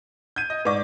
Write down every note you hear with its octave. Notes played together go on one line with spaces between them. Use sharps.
G6 G#6 D#7
D#5
G#2 B4 D5 C#6 D6